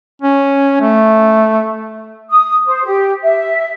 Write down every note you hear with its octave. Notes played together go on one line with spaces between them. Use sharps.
C#4
A3
D#6
C5
G4
E5